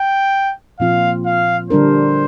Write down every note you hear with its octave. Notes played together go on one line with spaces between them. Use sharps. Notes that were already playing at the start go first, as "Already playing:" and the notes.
Already playing: G5
A#2 F3 C4 F4 F5
F5
D3 G3 D4 A#4 C5